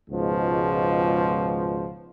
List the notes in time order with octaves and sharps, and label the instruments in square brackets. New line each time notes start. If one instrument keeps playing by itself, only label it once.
[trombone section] C#2 G#2 B2 F3